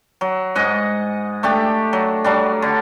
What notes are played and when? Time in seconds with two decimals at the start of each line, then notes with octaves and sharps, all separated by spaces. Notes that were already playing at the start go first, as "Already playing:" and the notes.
0.21 F#3
0.55 G#2 D#5 F#5
1.43 A3 D4 G4
1.93 F#3
2.24 F#3 G3 D4
2.62 D3